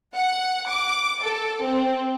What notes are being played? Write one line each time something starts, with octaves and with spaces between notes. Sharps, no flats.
F#5
D6
A4
C4